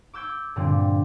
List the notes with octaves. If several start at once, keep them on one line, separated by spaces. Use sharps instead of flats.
D6 E6 G6 G#6 D7
G2 A#2 D3 G3 C4